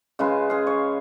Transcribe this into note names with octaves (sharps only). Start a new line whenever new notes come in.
C#3 G#3 F4 B4
G#4 F5
C#5